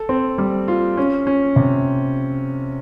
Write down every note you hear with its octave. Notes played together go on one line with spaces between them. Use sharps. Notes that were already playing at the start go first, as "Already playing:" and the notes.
Already playing: A4
C4
G3
F4
C#4
C#4
C3